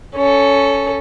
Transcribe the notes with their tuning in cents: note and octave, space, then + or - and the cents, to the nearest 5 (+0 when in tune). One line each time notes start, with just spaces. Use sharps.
C#4 +10 A4 +0